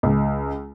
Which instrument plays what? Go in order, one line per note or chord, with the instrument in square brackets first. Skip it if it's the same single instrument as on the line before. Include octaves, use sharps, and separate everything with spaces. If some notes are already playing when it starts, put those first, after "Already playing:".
[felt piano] C#2